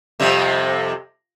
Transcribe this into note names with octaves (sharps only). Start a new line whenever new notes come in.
F2 C3 G3